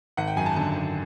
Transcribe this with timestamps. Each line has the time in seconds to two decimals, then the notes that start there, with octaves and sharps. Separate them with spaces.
0.17 G#1 F#5
0.28 G5
0.36 F#2 G#5
0.46 A5
0.56 D3 A5
0.76 G#1